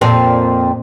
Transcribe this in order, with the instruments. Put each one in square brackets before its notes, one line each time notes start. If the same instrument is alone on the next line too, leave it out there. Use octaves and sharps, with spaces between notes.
[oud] F2 A#2 C4